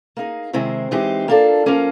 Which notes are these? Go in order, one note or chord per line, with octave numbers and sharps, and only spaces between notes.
A#3 D#4 G#4
C3 D#3 G#3 C4 E4
E3 G#3 C4 D#4 G4
A#3 D4 F4 A4
F3 A#3 C#4